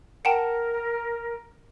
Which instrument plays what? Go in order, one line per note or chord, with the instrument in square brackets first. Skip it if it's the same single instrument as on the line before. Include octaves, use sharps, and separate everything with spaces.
[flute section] A#4 [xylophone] F#5 G5 A5